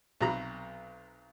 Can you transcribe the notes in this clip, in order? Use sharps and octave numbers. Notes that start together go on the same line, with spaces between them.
B1 C3 F#3 A#5 B5